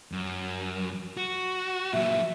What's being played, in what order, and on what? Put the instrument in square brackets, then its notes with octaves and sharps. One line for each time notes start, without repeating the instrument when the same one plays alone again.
[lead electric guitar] F#2
F#4
[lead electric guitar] A#2 F#3 [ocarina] E5